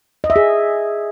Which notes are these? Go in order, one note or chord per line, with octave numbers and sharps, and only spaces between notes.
D#5
E5
G#4